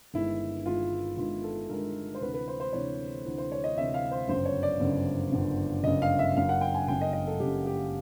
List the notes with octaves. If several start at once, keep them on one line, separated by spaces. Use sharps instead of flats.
G1 G2 D#3 G#3 E4
G1 G2 D#3 G#3 F4
G1 G2 D#3 G#3 F4
A4
G1 G2 D#3 G#3 A#4
C5
D2 C3 E3 B4
B4
C5
C5
D2 C3 E3 C#5
D2 C3 E3
C5
C#5
D#5
D2 C3 E3 E5
F5
C5
G1 F#2 C#3 C5
C#5
D5
G1 F#2 C#3
G1 F#2 C#3
G1 F#2 C#3 D#5
F5
E5
F#1 F#2 C#3 F5
F#5
G5
G#5
F#1 F#2 C#3 G5
D#5
D#5
A4
F#1 F#2 C#3 G4
G4